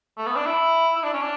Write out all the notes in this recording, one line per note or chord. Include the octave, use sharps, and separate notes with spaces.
A3
B3
D4
E4
E4
D4
C#4
D4